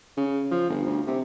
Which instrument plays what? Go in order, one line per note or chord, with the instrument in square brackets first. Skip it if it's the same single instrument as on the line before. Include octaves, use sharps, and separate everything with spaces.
[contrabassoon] C#3
F3
G1
D2
C3